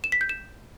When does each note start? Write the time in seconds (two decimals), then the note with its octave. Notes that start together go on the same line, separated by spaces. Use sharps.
0.04 E7
0.12 B6
0.21 G6
0.29 E7